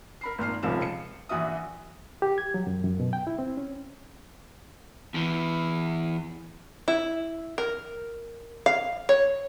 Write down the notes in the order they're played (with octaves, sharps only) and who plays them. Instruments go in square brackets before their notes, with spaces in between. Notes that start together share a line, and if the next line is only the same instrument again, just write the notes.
[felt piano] A#4 B5 C7
G#1 A#2 F6 C7
D#1 C#2 C3 F3 C#4 E7
C#7
A#1 E3 F#4 E5 D#6
[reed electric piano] G4
G#6
F#3
F#2
F#2
B2
G5
E4
C4
C#4
[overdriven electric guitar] E2 E3
[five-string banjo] E4
A#4
F5
C#5